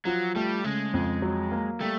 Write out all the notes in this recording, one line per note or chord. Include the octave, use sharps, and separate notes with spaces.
F3 F#3
G3 A3
C#3 G#3
F2
F#3
A#3
G3 A3